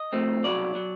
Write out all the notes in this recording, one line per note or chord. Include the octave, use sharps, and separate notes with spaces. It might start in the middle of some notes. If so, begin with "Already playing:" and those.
Already playing: D#5
A2 F3 A3 C4
C2 B2 F#3 D5
B2 F#3